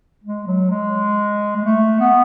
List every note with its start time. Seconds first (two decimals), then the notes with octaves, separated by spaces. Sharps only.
0.24 G#3
0.47 F#3
0.70 G#3
1.56 G#3
1.65 A3
2.00 B3